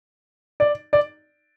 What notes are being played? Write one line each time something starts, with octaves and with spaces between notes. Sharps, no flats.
D5
D5